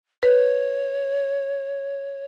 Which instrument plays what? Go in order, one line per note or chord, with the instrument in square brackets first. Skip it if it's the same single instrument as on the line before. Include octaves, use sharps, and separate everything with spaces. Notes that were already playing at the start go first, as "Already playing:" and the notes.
[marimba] B4 [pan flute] C#5